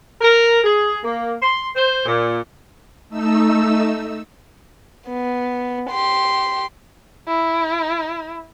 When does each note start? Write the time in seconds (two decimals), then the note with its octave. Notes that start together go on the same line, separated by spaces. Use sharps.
0.21 A#4
0.64 G#4
1.04 A#3
1.43 C6
1.76 C5
2.06 A#2
3.09 A3 D#4 E6
5.06 B3
5.89 G4 C6
7.27 E4